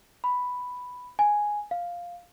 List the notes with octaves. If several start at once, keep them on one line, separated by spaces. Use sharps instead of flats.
B5
G#5
F5